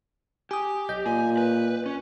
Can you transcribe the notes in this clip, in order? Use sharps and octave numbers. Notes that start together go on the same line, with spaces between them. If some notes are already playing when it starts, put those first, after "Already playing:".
G4 G#5 D#6
B1 D#5 G6
A#2 G#5
B4
C#4